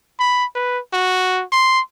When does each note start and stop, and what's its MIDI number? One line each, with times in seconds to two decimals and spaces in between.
0.20 0.45 83
0.55 0.79 71
0.93 1.43 66
1.52 1.80 84